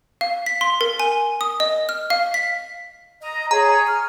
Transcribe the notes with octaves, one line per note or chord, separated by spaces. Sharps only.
F5
B6
C6
A#4
G#5
D#6
D#5
F6
F5
B6
D#5 A#5
G#4 C#5 A#5
F6